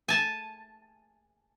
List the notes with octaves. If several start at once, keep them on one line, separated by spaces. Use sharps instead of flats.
G#5 A5